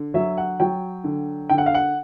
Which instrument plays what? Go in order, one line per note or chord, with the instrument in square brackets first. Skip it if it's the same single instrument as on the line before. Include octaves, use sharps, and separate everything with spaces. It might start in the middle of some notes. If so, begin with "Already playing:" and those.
Already playing: [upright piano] D3
F#3 E5
F#5
F#3 G5
D3
D3 G5
F#5
F5
F#5